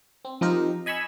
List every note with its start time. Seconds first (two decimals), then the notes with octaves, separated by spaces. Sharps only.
0.25 C4
0.41 F3 C4 D#4 G4 A#4
0.86 D#5 G#5 B5 C#6 E6